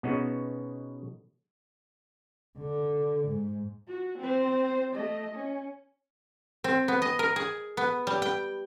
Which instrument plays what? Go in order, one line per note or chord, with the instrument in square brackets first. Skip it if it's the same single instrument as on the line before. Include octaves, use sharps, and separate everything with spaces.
[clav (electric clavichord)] B2 B3 C#4 D#4 F#4 G#4
[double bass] D3
G#2
[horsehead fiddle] F#4
C4 C5
A3 D#5
C#4
[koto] C4
B3
D#5
A#4
G#4
B3
G3
G5